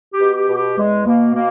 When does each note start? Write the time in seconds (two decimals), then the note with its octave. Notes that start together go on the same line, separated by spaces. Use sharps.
0.14 G4
0.20 B2
0.35 G4
0.49 B2
0.56 G4
0.77 E2 G#3
1.06 B2 A#3
1.35 B2 A#3